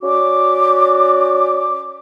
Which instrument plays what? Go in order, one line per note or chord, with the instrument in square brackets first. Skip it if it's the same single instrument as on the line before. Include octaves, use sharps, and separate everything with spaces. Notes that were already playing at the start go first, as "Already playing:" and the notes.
[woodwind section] C#4 F#4 D5 D6